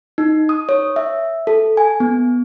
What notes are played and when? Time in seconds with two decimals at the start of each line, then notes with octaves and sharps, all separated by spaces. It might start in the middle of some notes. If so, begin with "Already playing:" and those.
0.18 D#4
0.49 D#6
0.69 C#5
0.96 E5
1.47 A4
1.77 G#5
2.00 B3